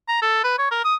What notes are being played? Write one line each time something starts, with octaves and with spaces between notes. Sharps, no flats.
A#5
A4
B4
C#5
A#4
D#6